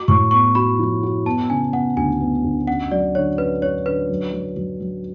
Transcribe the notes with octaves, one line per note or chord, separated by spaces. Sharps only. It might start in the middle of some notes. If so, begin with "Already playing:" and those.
Already playing: F#4 D6
A2 C#6
B3 C#6
F#4 B5
F3
F#4
B3 A5
C#3 G#5
B3 F#5
D2 G#5
B3
D2
C#4 F#5
F#3 D5
D3 C#5
C#4 B4
C#4 C#5
D3 B4
F#3
F#3
F#3
F#3